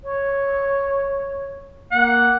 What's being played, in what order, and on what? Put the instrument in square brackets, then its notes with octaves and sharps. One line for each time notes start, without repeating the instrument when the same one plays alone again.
[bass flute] C#5
[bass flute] A#3 [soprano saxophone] F#5